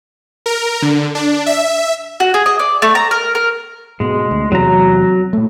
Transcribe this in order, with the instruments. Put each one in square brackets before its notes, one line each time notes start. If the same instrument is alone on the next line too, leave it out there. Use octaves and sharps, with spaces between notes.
[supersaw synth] A#4
D3
D4
E5
[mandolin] F#4
G#4
D#5
D5
A3
A#5
A#4
A#4
[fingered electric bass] G#2 B2 [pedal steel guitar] G#3
[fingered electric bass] D2
[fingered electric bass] E2 C3 [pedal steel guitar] F#3 A#5
[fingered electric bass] A#2 A3